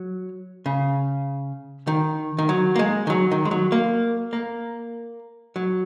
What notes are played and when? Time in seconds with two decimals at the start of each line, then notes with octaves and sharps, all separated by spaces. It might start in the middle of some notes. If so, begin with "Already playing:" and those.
Already playing: F#3
0.66 C#3
1.87 D#3
2.38 D#3
2.49 F#3
2.76 A#3
2.79 G#3
3.07 D#3
3.10 F#3
3.31 D#3
3.45 G#3
3.51 F#3
3.72 A#3
4.33 A#3
5.56 F#3